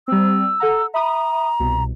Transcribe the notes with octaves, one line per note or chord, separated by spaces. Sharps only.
G3 C4 E6
A4 F#5 A#5
E5 A#5 B5 D#6
C2 B2